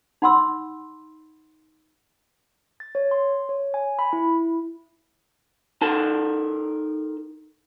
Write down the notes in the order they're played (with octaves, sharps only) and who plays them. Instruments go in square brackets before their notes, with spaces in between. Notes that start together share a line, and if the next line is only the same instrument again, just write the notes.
[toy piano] D#4 F#5 B5 C6 E6
[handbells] A6
C#5
C6
C#5
G#5
B5
E4
[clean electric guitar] D#4 A4 A#4 A5